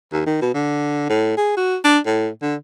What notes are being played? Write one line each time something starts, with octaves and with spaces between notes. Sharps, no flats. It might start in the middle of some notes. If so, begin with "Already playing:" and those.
D#2
D#3
B2
D3
A2
G#4
F#4
D4
A2
D3